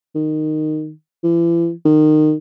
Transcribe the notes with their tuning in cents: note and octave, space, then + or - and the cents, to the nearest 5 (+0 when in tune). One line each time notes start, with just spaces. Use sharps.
D#3 -10
E3 +40
D#3 -20